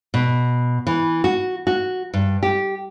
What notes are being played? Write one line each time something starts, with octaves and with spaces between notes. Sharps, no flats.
B2
E3
F#4
F#4
G2
G4